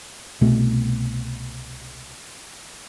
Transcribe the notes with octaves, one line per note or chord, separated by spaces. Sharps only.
C2 B2 A3